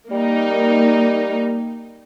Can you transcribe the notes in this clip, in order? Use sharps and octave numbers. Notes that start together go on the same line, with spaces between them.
G3 A#3 D#4